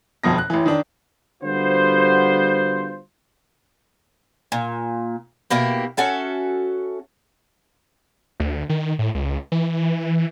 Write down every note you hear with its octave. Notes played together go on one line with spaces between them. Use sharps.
G1 F2 B2 A#6
F#6
A1 E3
D#3 D4
D3 G3 B3 F4 F#4 C5
A#2
B2 A#3 E4 G4
C#4 F#4 A4 E5
D2
D#3
A2
C#2
E3